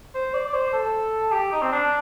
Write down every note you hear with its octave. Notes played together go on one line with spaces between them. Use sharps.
C5
D5
D5
C5
A4
G4
D#4
C4
D4